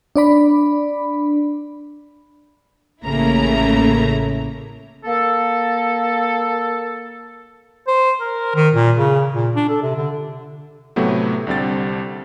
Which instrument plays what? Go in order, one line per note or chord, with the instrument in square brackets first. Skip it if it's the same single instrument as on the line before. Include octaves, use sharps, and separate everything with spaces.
[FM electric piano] D4 D5 B5
[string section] A1 C#3 A3 A#3 E4 A#5
[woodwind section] A#3 A4
[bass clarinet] C5
A#4
D#3
A#2
C#3
A#2
D4
A4
C3
D3
[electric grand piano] A2 C3 F#3 A3 B3
C2 D3 G3 C4 A6